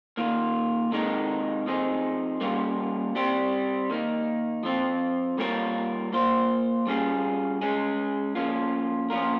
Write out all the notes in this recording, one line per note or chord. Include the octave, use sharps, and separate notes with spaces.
D#3 A#3 F4
C3 D#3 G#3 D#4 A#4
F3 C4 D#4 G#4
G3 A#3 C#4 F4
G3 C4 G4 C5
D#3 A#3 D#4
F3 C4 F4
G3 A#3 F4 A#4 C#5
A#3 F4 C5
G3 C#4 F4 G#4
G#3 C#4 G#4
F3 A#3 C#4 F4
F3 A#3 C#4 F4 A#4